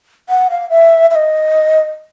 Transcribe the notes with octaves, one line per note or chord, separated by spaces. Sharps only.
F#5
F5
E5
E5
D#5